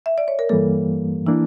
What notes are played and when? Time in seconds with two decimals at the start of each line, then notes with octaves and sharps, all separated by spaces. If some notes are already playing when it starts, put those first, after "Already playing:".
0.06 E5
0.18 D5
0.28 C#5
0.39 A#4
0.49 G2 E3 G3 A#3 A4
1.26 E3 A#3 D4 E4